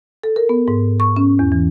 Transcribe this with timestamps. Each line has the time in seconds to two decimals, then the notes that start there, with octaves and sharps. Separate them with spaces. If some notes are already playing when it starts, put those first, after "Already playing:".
0.24 A4
0.36 A#4
0.49 B3
0.68 G#2
1.00 C#6
1.17 C#4
1.39 E2
1.52 E3